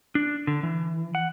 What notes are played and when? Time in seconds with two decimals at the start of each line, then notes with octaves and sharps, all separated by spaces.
0.15 D4
0.47 D3
0.63 E3
1.15 F#5